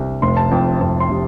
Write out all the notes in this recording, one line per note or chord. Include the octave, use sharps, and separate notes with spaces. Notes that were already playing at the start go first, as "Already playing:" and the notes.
Already playing: C2
F1 C6
A5
F2 G5
F2 A5
C6
C3